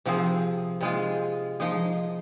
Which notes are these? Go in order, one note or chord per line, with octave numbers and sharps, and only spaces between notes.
C3 F3 C4 G#4
C3 G#3 F4 G#4
F3 G#3 D#4 G#4